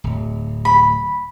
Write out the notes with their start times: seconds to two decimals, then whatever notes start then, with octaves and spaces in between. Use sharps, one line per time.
0.04 D1
0.65 B5